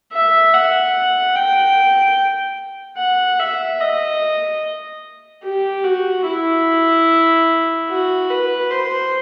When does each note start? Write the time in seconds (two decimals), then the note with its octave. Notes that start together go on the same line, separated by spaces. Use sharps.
0.12 E5
0.53 F#5
1.35 G5
2.98 F#5
3.39 E5
3.80 D#5
5.44 G4
5.84 F#4
6.26 E4
7.89 F#4
8.30 B4
8.71 C5